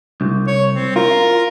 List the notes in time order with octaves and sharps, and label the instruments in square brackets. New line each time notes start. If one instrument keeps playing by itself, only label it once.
[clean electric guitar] C2
[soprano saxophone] C#5
C4
[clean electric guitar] F4 [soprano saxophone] A#4